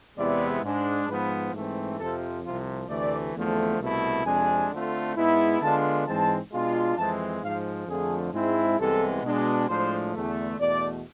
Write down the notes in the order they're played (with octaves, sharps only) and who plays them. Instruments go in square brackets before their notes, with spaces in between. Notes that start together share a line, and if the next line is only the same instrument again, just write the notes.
[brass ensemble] E2 C3 G#3 B3 E4 D5
G#2 G#3 D4
G#2 F3 B3 B4
G#2 E3 A3 C4
F2 C3 F3 A4
C2 C3 F3 F4
D2 C3 E3 A3 D5
E2 D3 F3 A3 C4
C2 B2 A3 E4
F2 C3 G#3 D4 G#5
D3 A3 C4 F4
G#2 G#3 B3 E4
D3 G#3 B3 D4 F4 A5
G#2 E3 G#3 C4 A5
B2 G#3 D4 F4
F2 E3 G#3 C4 A5
G#2 F3 G#3 F5
F2 D3 F3 A3 G#4
G#2 G#3 C4 E4
C2 C3 E3 G#3 B3 A4
B2 G#3 D4
A2 F3 G#3 D4 C5
E2 D3 A3
E2 B2 A3 D5